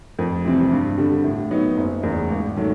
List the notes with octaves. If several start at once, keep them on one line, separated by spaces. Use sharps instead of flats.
F2
C3 E3 G3 C4
G2
D3 G3
A2
F#3 B3 D#4
F#1
E2 C#3
G#1
D#3 F#3 A3